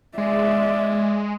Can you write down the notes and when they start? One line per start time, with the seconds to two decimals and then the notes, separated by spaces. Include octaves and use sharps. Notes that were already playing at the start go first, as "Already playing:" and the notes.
0.18 G#3 D5 E5